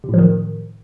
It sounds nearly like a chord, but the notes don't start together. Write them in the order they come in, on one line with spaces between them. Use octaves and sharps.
C3 A2 F3 D#3